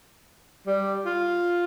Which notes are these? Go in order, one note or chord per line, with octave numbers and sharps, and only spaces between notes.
G3
F4